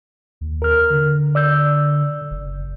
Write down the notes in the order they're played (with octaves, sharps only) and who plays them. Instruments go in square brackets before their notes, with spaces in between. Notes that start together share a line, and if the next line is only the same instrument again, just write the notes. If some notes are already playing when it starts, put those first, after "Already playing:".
[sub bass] D#2
[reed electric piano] A#4 F6
[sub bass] D3
[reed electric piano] D5 E6 G6
[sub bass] F#1